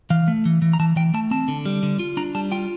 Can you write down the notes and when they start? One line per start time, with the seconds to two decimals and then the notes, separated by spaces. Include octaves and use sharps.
0.10 E3 F5
0.28 A3
0.45 E3
0.62 E3
0.73 A#5
0.80 E3 A5
0.96 E3 G5
1.14 A3 A5
1.31 C4 A5
1.48 D3
1.66 G3
1.83 D3
1.99 F4
2.17 D4 A#5
2.35 G3 A5
2.52 F4 G5